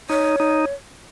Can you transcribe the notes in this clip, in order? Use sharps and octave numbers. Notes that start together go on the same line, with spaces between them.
D#4 C#5
D#4